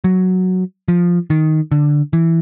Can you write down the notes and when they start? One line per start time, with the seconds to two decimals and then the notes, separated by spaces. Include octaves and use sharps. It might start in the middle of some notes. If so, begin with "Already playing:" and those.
0.04 F#3
0.88 F3
1.30 D#3
1.72 D3
2.13 E3